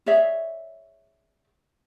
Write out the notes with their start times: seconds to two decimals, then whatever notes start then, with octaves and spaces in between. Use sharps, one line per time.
0.06 G#4 C#5 D5 E5